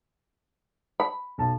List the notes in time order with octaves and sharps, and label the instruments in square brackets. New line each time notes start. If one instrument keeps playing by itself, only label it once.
[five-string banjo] B5
[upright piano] B1 A5